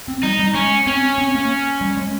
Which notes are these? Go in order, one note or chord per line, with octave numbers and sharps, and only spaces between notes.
C4
G3 D#4
G3
G#3 C#4
C4 C#4
C4
A#3
G3
G#3